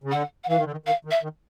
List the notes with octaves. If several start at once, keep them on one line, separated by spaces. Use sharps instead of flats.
C#3
D3 F#5
F#5
E3 F5
D#3
D3
D#3
D#3 F5
D#3
E5
D#3